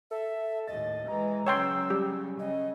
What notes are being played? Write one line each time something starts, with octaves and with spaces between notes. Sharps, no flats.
A4 E5
D#2 A2 D#5 A6
E3 G#3 A#5
C#3 F#3 C#5 G5 C6 E6
G3 G4
C#3 D#5